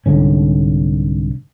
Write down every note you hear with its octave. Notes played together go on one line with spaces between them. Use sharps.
C2 G#2 D3 C#4